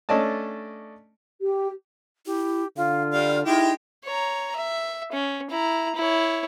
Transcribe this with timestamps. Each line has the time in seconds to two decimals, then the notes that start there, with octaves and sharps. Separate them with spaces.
0.09 A3 C#4 D4 D5 D#5 A5
1.41 G4
2.26 E4 G4
2.77 D3 F4 F5
3.13 G3 D5 F5
3.46 G#3 D#4 E4 G4 G5
4.05 C#5 A#5
4.56 E5
5.12 C#4
5.50 E4 A#5
5.95 E4 C#5